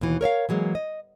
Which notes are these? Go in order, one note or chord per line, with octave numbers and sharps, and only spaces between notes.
D#2 B2 E3
A#4 C#5 E5 F5
E3 F#3 G#3 A#3
D#5